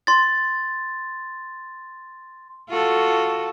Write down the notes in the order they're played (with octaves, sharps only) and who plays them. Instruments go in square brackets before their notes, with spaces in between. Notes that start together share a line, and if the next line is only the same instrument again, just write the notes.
[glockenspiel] C6 A6
[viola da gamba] F4 F#4 A4